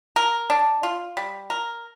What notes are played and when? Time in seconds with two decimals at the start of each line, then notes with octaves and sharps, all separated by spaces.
0.16 A#4
0.50 D4
0.83 F4
1.17 G3
1.50 A#4